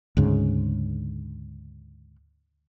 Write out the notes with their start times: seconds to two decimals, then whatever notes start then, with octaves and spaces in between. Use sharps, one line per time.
0.17 D2 G#2 C#3